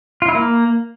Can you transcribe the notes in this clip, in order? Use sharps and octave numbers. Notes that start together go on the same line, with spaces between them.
F4
E4
A#3